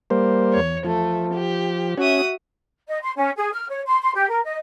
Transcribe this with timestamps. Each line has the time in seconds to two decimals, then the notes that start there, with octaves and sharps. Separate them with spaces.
0.10 G3 A#3 C5
0.52 E2 C#5
0.85 F3 A3
1.33 G4
1.98 C#4 F#4 E5 D#6
2.88 D#5
3.02 C6
3.17 C#4
3.36 G#4
3.53 F6
3.69 C#5
3.85 C6
4.01 C6
4.14 G4
4.29 A#4
4.43 D#5